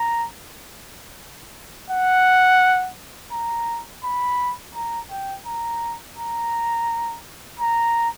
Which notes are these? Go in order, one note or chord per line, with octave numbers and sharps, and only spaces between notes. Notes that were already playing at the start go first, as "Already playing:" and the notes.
Already playing: A#5
F#5
A#5
B5
A#5
G5
A#5
A#5
A#5